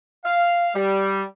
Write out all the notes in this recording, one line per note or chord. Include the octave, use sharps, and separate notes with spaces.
F5
G3